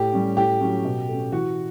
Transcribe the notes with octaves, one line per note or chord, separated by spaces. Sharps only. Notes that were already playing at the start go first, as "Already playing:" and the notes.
Already playing: A2 G4
G3 C#4
A2 G4
F#3 C#4
B2
A3 C#4
E3 F#4